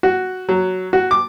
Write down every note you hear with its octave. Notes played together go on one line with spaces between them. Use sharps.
F#4
F#3
F#4
D6